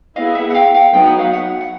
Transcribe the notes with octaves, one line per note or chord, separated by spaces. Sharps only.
B3 E4 G#4 D#5 F5
E5 F#5
F#5
F5 G5
F5 G5
F#3 B3 D#4 G5
F#5
F5
E5 F#5
F#5